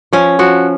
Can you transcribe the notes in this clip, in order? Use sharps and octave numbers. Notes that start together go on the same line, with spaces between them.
F3 C#4
F3 F#4